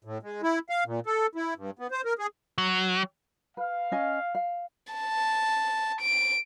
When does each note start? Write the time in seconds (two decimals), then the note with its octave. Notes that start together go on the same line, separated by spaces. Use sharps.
0.04 A2
0.22 G#3
0.43 E4
0.69 F5
0.86 A#2
1.06 A4
1.35 E4
1.56 G2
1.79 B3
1.91 C5
2.05 A#4
2.19 G#4
2.58 F#3
3.57 B4 F5
3.92 C#4 D#5 G#5
4.35 F5
4.93 A5
6.01 D7